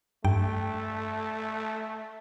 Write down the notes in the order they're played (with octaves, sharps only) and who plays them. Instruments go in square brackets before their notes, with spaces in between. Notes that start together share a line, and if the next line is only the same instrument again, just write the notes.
[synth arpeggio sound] G2 G5 [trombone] A3